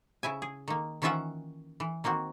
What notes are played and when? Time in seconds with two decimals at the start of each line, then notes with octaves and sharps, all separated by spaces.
0.23 C#3 E4 E5 G#5
0.42 G#4
0.68 D#3 A#3
1.02 D#3 E3 C#4 F4 E5 F#5
1.80 E3
2.04 D#3 A#3 C4 F#4